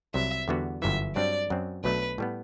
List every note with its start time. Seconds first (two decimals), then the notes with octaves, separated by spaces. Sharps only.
0.14 C2 C3 F#3 E5
0.48 E2 D3 G3 B3 F#4
0.82 G1 F#2 E3 E5
1.16 G2 F#3 C4 D5
1.50 F#2 F#3 C4
1.84 B1 B2 F#3 A3 D4 B4
2.18 A2 G3 B3